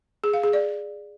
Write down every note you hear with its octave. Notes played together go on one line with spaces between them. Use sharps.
G#4
F5
G#4
D5